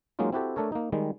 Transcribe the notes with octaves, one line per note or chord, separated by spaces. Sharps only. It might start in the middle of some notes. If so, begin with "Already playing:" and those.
F#3 G#3 A#3 C#4 D#4 F4
C4 E4 F#4 G4 A4
A3 D4 A4 A#4 C#5
A#3 D#4
D#3 G3 G#3